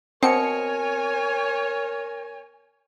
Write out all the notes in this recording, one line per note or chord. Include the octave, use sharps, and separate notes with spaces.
B2 C4 A#4 C#5 G#5 C#7